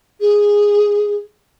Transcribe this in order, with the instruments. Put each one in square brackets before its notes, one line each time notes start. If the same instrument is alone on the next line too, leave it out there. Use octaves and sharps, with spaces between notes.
[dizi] G#4